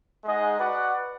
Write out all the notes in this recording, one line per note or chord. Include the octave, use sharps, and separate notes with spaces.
G#3 D#4 G#4 D#5 F#5
F#4 B4 D5 F#5